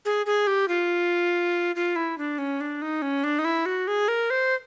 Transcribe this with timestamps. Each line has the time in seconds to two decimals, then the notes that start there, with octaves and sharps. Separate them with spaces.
0.05 G#4
0.26 G#4
0.47 G4
0.68 F4
1.76 F4
1.96 E4
2.18 D4
2.38 C#4
2.61 D4
2.82 D#4
3.02 C#4
3.24 D4
3.39 D#4
3.45 E4
3.66 F#4
3.88 G#4
4.08 A#4
4.30 C5